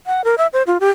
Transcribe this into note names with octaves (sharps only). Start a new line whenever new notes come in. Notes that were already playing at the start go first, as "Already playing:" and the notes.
F#5
A#4
E5
C5
F4
G4